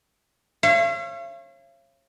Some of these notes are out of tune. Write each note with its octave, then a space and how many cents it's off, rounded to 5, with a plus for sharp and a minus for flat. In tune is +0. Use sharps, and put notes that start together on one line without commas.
C#5 -30 F5 -45